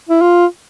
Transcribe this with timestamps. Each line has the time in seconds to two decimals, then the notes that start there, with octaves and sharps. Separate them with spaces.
0.09 E4
0.21 F4